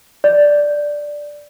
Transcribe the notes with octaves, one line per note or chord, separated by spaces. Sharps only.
D5